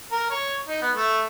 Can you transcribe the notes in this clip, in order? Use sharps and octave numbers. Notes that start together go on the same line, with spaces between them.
A#4
C#5
D#4
B3
A3